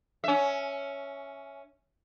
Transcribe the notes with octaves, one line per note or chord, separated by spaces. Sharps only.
C#4 E5